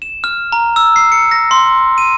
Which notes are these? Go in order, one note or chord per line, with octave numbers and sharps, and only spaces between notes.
E7
F6
A#5
E6
C7
C#7
A#6
C6
D#7